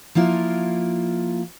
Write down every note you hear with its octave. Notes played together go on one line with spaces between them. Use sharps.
F3 A#3 E4 F4 A#4